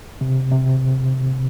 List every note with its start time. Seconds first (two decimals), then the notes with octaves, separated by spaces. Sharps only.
0.21 C3
0.51 C3